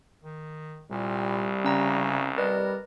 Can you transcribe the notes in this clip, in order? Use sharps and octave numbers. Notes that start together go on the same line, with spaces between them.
D#3
C2 A#2 G3
C#3 C#4 A#5 A#6
G3 A#4 B4 D5 D#5